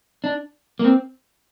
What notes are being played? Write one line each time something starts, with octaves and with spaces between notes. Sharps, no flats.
D4
A#3
C4